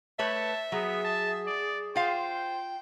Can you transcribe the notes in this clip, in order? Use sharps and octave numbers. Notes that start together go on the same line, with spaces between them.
A3 B4 C#5 E5 A5
F#3 B3 G#4
A5
D5
F4 C5 F5 G5